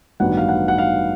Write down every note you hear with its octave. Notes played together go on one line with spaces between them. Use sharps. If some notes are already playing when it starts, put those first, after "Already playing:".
A1 G2 D#3 F#3 B3 F#5
F5
F#5
F#5
F5